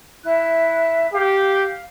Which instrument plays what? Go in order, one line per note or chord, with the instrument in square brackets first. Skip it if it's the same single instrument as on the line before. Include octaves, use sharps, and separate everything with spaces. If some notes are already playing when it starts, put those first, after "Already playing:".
[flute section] E4 E5 F#6
[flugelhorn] G4 [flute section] F5